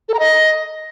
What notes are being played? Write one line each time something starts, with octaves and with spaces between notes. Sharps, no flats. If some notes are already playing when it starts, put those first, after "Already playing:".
A4
A#5
D#5